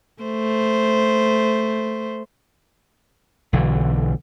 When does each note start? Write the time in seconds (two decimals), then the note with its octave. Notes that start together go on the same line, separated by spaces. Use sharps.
0.23 A3 C5
3.53 B1 D3 E3